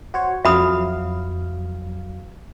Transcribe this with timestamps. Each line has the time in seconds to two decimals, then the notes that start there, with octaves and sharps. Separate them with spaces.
0.14 F#4 C5 C#5
0.45 F2 F#3 E5 F5 B5 D#6